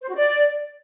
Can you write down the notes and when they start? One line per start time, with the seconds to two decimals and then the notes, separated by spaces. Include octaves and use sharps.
0.01 C5
0.08 F#4
0.15 D5